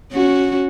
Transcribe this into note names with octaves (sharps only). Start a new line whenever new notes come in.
C#4 F#4